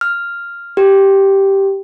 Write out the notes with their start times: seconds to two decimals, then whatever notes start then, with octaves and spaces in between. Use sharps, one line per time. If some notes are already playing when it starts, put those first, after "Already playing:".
0.01 F6
0.77 G4